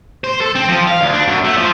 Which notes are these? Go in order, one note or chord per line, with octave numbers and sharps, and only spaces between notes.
C5
A4
C4
F3
F5
D2
D4
F#2
A3
F3